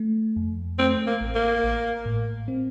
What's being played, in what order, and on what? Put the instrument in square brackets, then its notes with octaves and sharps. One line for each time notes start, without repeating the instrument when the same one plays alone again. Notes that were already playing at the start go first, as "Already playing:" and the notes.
Already playing: [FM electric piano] A3
F2
[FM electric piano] A3 [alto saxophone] C4
[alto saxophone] A#3
[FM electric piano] A1
[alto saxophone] A#3
[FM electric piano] A1
A2
C4